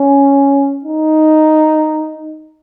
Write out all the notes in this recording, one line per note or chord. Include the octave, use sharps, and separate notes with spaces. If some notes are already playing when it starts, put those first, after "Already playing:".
Already playing: C#4
D#4